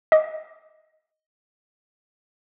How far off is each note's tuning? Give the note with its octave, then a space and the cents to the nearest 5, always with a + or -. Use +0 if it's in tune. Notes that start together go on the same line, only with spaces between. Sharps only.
D#5 +10 D6 +0